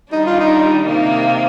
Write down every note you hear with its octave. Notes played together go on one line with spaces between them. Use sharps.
D#3 G3 D4 D#4
F4
D#4
C3 D#3 A#3